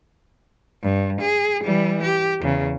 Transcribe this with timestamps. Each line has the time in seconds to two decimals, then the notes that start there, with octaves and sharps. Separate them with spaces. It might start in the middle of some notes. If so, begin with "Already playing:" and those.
0.83 G2
1.21 G#4
1.64 E3 G3
2.03 G4
2.41 E2 C#3